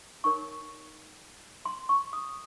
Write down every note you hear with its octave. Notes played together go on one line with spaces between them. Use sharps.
D#4 A#4 C#5 C#6
C6
C#6
D#6